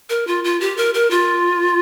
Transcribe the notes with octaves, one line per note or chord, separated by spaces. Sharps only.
A#4
F4
F4
G4
A#4
A#4
F4